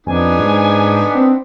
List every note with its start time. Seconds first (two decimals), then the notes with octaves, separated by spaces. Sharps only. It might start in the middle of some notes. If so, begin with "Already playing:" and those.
0.07 F2 B3 D4 D#4 G#5
0.39 G#2
1.15 C4